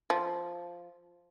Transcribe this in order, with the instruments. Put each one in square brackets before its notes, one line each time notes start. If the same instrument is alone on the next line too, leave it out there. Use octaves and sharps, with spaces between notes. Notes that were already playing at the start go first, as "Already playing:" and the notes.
[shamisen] F3